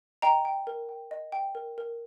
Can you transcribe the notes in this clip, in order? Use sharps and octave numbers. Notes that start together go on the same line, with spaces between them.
D#5 G5 A#5
G5
A#4
G5
D#5
G5
A#4
A#4